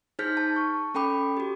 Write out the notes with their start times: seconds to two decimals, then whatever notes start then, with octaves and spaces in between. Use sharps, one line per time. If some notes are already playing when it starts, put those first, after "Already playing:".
0.19 D#4 G#4 C5 F6 G6 B6
0.37 A5
0.56 C#6
0.94 C#4 A4 G5 B5 D6
1.37 F#4 G4